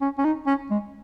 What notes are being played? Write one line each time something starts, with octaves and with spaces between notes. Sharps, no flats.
C#4
C#4
D#4
C#4
G#3